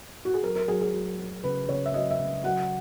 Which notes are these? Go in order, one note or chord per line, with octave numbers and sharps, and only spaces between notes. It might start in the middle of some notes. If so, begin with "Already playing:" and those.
F#4
G#4
F#3 A#4
A#4
F#3 G#4
G#4
F#3
F#3
C#3 B4
C#3 C#5
E5
F#3 D#5
E5
C#3
F#3 F#5